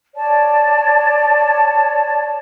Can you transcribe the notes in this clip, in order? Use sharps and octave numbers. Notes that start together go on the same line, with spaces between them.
C#5 D5 A5